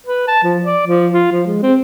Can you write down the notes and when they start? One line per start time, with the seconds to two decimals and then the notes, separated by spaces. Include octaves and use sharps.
0.07 B4
0.28 A5
0.44 F3
0.65 D5
0.87 F3
1.13 F4
1.32 F3
1.47 G#3
1.63 C4